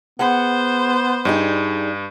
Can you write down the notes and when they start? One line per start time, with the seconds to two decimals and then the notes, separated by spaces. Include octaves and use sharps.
0.19 B3 G#4 C5 F#5
1.25 G2 G3 D#4 G#4